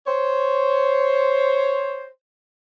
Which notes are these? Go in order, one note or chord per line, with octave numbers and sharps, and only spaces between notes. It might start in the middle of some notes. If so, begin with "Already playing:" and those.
C5 C#5